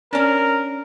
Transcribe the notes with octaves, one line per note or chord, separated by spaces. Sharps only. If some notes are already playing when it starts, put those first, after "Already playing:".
C#4 D4 A#4